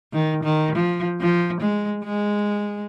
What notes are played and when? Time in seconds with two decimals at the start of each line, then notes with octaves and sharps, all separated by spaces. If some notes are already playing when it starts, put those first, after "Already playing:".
0.13 D#3
0.43 D#3
0.75 F3
1.21 F3
1.61 G#3
2.04 G#3